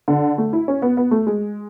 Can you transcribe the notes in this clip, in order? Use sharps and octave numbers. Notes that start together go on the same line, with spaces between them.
D3
A3
E4
C#4
B3
B3
A3
G#3